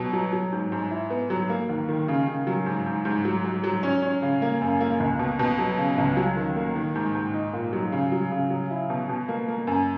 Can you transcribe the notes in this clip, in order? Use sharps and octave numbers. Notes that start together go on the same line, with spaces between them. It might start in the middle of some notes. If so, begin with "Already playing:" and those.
Already playing: B2 F#3
F#3
F#3
G#2
G#2
E4
B3
F#3
A#3
D#2
D#3
C#3
C#3
F#3
G#2
G#2
G#2
F#3
F#3
F#3
C#4
C#4
C#3
A#3
F#2
A#3
C#2
B2
B2
F#3
C#3
C#2
F#3
D#3
A#3
D#3
G#2
G#2
D#4
A#2
F#3
C#3
F#3
C#3
F#3
E4
B2
B2
A#3
A#3
F#2